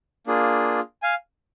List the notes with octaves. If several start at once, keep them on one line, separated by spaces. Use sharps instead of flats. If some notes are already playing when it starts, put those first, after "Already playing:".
A#3 D4 F4 G#4
F5 G#5